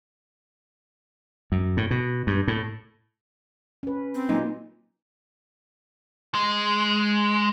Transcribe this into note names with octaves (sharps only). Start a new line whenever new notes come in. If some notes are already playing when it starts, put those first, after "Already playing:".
F#2
A2
B2
G2
A2
C#4 B4
C4
A#2 F#3 D#4
G#3